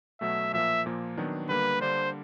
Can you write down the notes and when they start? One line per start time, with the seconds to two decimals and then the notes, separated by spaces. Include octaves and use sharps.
0.21 B2 F#3 A3 E5
0.53 A#2 F3 A#3 E5
0.86 A#2 F3 A#3
1.17 D#3 F#3 B3 D4
1.49 D3 G3 A#3 B4
1.81 D3 G3 A#3 D4 C5